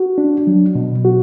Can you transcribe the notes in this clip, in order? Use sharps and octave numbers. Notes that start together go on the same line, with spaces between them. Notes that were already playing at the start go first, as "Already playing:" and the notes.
Already playing: F#4
D4
F#3
B2
F#4